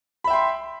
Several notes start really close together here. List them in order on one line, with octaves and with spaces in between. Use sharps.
B5 E5 G5 C6